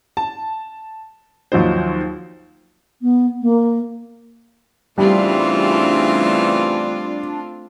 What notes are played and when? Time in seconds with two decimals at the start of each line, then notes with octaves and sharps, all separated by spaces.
0.17 A5
1.52 D#2 F3 F#3 D#4 C5
3.01 B3
3.41 A#3
4.98 C#3 E3 G3 A3 C4 D4 F4